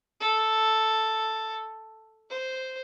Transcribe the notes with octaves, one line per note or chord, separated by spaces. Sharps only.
A4
C5